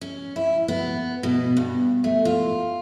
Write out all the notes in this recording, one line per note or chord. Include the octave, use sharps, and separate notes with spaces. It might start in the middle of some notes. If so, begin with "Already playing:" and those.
C#4
E4
B3
B2
G2
A3
F4